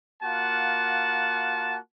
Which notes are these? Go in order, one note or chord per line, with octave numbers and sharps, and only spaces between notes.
A#3 F4 F#4 F#5 A5